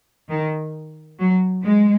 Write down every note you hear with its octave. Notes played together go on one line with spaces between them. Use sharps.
D#3
F#3
G#3